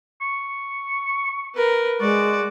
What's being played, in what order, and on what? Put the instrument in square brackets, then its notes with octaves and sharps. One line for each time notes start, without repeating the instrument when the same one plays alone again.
[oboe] C#6
[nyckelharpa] A#4 B4
[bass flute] G#3 [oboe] F#4 [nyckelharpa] D5